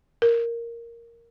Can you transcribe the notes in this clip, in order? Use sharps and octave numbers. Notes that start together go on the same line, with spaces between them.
A#4